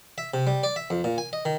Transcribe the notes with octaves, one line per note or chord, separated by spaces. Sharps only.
E5
C3
G3
D5
E5
F2
A#2
G#5
D#5
D#3